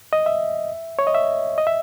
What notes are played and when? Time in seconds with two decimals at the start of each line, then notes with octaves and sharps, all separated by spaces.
0.13 D#5
0.26 E5
0.99 C#5
1.07 D#5
1.15 E5
1.58 D#5
1.67 E5